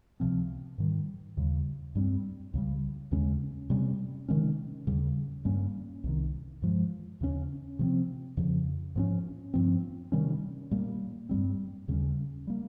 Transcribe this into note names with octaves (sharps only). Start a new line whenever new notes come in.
C#2 C3 F3 C4
G#2 D#3 G3
D#2 C#3 G3
G2 G3 C4
C#2 C#3 G3
D#2 C#3 G#3 C#4
C3 G3 C#4
C3 D#3 G#3 C#4
D#2 C#3 G3
G2 G3 A#3 C#4
C2 C3 D#3
G2 F3 G#3
D#2 C#3 G#3 C#4
C3 F3 G#3 C4
F2 C#3 F3
G#2 F3 G#3 C#4
G2 F3 C4
C3 D#3 G3 C#4
A#2 G3 A#3
G2 G3 C4
D#2 C#3 G3 C#4
G3 A#3